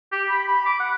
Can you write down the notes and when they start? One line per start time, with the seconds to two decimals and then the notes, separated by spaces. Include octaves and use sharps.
0.12 G4
0.29 B5
0.48 B5
0.66 D6
0.79 F#5